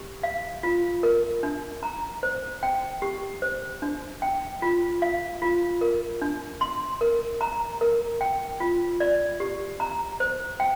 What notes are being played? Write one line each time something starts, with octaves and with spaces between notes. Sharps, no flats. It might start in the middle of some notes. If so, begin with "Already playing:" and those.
Already playing: G4
F5
F4
A#4
D4
A#5
C5
G5
G4
C5
D4
G5
F4
F5
F4
A#4
D4
C6
A#4
A#5
A#4
G5
F4
D5
G4
A#5
C5
G5